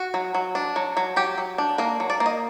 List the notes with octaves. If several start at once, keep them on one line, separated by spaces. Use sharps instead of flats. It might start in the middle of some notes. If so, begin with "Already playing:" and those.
Already playing: F#4
F#3
F#3
D4
F#3
F#3
F#3 G4
F#3
D4
A#3 A#4
F#3
D5
A#3
D#5